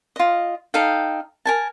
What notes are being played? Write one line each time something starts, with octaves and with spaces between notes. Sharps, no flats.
F4 D#5
D#4 A4 F5 G5
A#4 G#5 A5